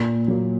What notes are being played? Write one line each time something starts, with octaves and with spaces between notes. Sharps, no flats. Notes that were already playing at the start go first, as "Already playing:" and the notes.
Already playing: A#2
F#3 A#3